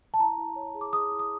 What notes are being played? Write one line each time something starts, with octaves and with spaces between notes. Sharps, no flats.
A5
E4 A#5
E4
C#5
G#4
D6
G#4 D#6
E4
D#6